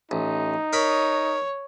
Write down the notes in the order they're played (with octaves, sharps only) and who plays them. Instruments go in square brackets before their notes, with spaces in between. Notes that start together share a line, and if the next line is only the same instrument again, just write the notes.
[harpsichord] A1 [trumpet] D#4
[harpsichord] A#4 D#5 B5 [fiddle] C#5